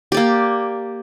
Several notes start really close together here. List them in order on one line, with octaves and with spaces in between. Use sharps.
G4 D5 A#3